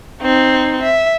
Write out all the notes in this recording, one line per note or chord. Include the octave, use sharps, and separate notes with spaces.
C4 D#4
E5